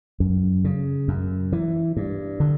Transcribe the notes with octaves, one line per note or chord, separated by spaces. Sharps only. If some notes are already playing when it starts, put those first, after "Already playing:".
F#2
C#3
F#2
E3
G2
D3